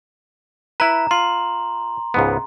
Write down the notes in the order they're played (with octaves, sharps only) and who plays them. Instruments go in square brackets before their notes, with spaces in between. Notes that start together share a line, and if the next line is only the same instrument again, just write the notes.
[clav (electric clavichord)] E4 B4 [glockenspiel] A#5
[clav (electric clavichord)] F4 [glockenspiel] C6
[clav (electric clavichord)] C#2 G#2 B3